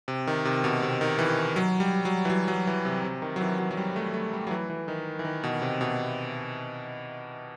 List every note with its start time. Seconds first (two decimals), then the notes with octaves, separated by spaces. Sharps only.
0.08 C3
0.27 D#3
0.45 C3
0.64 B2
0.82 C3
1.01 D#3
1.19 E3
1.56 F#3
1.80 G3
2.05 F#3
2.25 E3
2.30 F#3
2.48 F#3
2.67 E3
2.85 C3
3.04 C3
3.22 D#3
3.36 F#3
3.41 E3
3.59 F#3
3.71 F#3
3.77 G3
3.96 A3
4.14 A3
4.33 G3
4.47 F#3
4.51 E3
4.70 E3
4.88 D#3
5.19 E3
5.25 D#3
5.44 B2
5.62 C3
5.81 B2